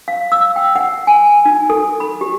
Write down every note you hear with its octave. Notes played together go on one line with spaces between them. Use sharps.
F5
E6
G5
F#5
G#5
D#4
A4
B5
G4